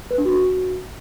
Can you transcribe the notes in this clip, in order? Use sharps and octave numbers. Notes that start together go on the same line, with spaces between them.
B4
D4
F#4